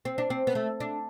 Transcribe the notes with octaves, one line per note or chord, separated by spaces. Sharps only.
C4
D4
C4
B3
A3
D4